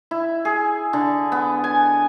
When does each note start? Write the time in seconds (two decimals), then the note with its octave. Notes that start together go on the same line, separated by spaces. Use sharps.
0.11 E4
0.45 G#4
0.93 D3
1.32 B3
1.64 G#5